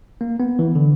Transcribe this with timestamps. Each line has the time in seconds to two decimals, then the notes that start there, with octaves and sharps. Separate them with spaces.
0.21 A#3
0.40 B3
0.59 E3
0.75 D3